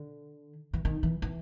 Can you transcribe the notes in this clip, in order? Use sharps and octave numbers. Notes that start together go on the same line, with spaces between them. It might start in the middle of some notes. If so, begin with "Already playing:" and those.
Already playing: D3
E3
D#3
E3
E3